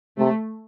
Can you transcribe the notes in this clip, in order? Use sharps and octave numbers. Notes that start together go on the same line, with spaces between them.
C3 A3